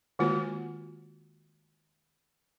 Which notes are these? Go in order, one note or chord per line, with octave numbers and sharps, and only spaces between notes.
D#3 G#3 A#3 F4 F#4 B4